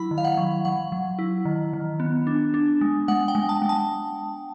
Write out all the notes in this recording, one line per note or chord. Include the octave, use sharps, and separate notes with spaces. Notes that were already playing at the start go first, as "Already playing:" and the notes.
Already playing: F#3 E4 B5
D#3
F5
F#5
F#3
F#3 F#5
F#3
E4
D#3
D#3
B3
D4
D4
G#3
G#3 F#5
G5
G#3
A5
G#3
A5